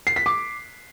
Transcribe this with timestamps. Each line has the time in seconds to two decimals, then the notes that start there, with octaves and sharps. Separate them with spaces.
0.07 C7
0.16 B6
0.26 D6